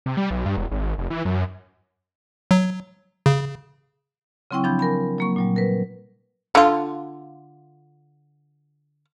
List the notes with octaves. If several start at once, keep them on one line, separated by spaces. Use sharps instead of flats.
C3
G3
B1
G2
E1
G#1
F1
E3
F#2
F#3
C#3
C#3 F#3 C4 E4 G5 C#6
F3 D4 B5 G6 G#6
A#4 G#5 B5
F#3 A#3 C#6
A#2 F#3 G3
A#4 B4
D3 F4